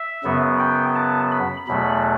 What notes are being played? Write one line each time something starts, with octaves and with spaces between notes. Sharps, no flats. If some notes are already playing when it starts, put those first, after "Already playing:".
Already playing: E5
F#2 C#3 F#3 B3
G5
A5
B5
E2 B2 F#3 A3 B5